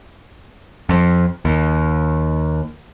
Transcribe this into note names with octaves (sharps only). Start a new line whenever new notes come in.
F2
D#2